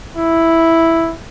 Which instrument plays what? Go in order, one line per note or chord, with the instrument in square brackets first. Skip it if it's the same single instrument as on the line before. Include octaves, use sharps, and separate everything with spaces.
[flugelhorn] E4